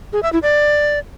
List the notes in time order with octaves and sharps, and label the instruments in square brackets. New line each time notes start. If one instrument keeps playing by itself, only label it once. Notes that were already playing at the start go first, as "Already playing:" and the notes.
[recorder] G#4
E5
E4
D5